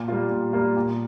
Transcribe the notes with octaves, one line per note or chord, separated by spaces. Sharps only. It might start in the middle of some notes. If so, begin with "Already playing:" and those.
Already playing: A#2
G3 A#3 F4
A#2
G3 A#3 F4
A#2